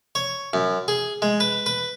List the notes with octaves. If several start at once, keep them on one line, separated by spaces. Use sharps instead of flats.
C#5
F#2
G#4
G#3
B4
B4